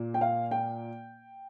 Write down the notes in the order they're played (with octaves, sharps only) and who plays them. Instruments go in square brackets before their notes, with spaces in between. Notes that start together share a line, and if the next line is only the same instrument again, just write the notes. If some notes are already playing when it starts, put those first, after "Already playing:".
Already playing: [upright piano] A#2 A#3
G5
F5
G5